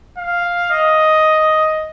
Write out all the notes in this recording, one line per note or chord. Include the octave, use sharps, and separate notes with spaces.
F5
D#5